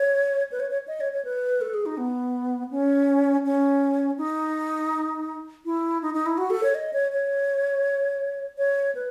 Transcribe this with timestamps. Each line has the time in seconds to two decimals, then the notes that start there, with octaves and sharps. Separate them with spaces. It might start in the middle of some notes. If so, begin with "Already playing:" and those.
Already playing: C#5
0.52 B4
0.60 C#5
0.70 C#5
0.88 D#5
1.01 C#5
1.13 C#5
1.25 B4
1.61 A4
1.74 G#4
1.86 D#4
1.97 B3
2.71 C#4
3.45 C#4
4.18 D#4
5.65 E4
6.02 D#4
6.14 D#4
6.26 E4
6.38 F#4
6.50 A4
6.63 C#5
6.75 D#5
6.93 C#5
7.12 C#5
8.58 C#5
8.95 B4